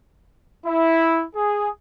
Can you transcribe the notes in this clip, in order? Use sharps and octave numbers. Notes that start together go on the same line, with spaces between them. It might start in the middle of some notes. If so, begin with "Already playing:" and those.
E4
G#4